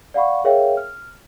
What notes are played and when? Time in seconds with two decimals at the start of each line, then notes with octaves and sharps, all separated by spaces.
0.14 D5 F5 F#5 B5 C#6
0.44 G#4 A#4 C#5 E5 F5 G5
0.77 F6